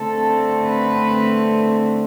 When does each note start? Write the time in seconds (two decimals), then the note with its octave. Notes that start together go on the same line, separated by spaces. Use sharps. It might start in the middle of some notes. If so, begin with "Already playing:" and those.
Already playing: D3 A3 C4 A4
0.65 B4